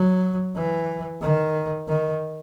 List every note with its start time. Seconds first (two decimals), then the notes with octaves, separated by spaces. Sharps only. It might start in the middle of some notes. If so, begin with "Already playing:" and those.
Already playing: F#3
0.56 E3
1.21 D#3
1.88 D#3